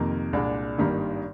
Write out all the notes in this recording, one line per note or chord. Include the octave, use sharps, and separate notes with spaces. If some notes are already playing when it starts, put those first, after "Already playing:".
Already playing: F2 C3 D#3 A#3
C2 A#2 G#3 D4
G#1 G2 D#3 G3 A#3